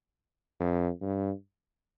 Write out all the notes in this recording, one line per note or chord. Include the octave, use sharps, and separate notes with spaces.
F2
G2